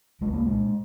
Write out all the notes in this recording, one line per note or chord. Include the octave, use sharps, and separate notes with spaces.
C2 G#3
A#3
A#2 G#3